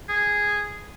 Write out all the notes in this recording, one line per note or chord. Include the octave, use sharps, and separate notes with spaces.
G#4